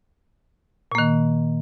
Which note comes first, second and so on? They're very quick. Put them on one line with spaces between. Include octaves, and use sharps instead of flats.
A#2 A#3 D#3